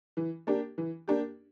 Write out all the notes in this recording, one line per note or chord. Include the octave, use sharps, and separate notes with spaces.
E3
A#3 D4 G4
E3
A#3 D4 G4